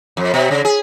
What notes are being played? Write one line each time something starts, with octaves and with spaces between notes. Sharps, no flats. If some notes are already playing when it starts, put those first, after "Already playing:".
F2
B2
C#3
G#4